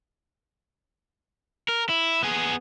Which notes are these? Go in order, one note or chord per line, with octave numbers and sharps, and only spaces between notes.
A#4
E4
B3 G#4